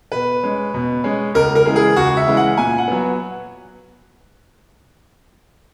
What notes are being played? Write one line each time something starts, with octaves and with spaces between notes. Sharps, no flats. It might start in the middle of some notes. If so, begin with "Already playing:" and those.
B2 B4
G#3 C#4
B2
G#3 C#4
C#2 A#4
A#4
C#3 E3 G#3
G#4
C#2 F#4
E5
C#3 E3 G#3
F#5
A#2 G#5
F#5
F#3 B3